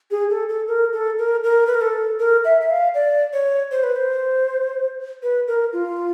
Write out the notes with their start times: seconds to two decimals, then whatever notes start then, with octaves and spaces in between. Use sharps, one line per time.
0.11 G#4
0.30 A4
0.49 A4
0.68 A#4
0.93 A4
1.19 A#4
1.44 A#4
1.67 B4
1.74 A#4
1.81 A4
2.20 A#4
2.45 E5
2.61 E5
2.70 F5
2.94 D5
3.33 C#5
3.71 C5
3.83 B4
3.96 C5
5.23 B4
5.47 A#4
5.73 F4